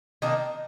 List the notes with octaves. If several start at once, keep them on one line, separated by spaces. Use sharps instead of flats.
D#3 A#3 D4